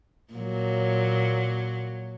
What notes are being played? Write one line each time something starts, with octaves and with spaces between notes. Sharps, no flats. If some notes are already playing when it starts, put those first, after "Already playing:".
A#2 F#3